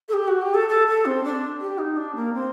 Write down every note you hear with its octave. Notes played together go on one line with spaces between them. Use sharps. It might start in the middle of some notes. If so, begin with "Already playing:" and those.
A4
G4
F#4
G4
A4
A4
A4
C4
D4
G4
D#4
D4
A#3
C4